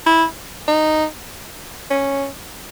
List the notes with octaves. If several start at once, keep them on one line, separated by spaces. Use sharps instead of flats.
E4
D#4
C#4